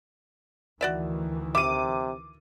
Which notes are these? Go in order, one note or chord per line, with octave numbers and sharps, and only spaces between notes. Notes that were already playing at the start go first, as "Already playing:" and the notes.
D2 D#3 E3 F#4 D5 E5
C3 E5 D6 D#7